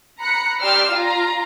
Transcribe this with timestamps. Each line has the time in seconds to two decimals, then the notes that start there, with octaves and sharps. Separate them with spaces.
0.19 A#5 B5 F#6 C#7
0.62 G4 D5 C6 E6 F6
0.92 F4 F5 A#5